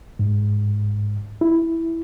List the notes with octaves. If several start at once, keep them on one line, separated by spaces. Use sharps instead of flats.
G#2
E4